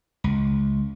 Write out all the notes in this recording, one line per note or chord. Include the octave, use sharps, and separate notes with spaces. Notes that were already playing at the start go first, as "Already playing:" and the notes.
C#2